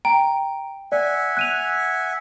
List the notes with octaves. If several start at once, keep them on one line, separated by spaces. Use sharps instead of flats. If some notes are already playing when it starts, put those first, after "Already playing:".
G5 A#5
D5 E5 F#5 G#5
F#6 D#7 F7